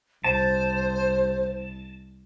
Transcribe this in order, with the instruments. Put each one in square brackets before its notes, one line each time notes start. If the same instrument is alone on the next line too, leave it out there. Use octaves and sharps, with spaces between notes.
[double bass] C2 [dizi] C5 [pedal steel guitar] A5